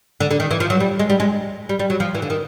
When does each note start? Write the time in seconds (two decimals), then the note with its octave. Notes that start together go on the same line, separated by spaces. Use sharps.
0.20 D3
0.31 D3
0.40 D#3
0.51 E3
0.60 F3
0.70 F#3
0.80 G3
0.99 G#3
1.10 G3
1.20 G#3
1.69 G3
1.79 G3
1.90 F#3
2.00 F3
2.15 E3
2.22 D3
2.30 D#3